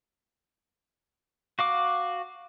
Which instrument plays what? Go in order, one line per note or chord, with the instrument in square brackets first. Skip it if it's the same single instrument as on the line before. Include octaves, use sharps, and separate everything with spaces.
[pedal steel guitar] F#4 F5 D6